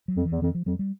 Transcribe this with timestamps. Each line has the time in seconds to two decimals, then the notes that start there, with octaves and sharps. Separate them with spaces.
0.08 F#3
0.17 F2
0.25 E3
0.32 E2
0.42 F2 E3
0.55 F3
0.66 F2 F#3
0.79 G3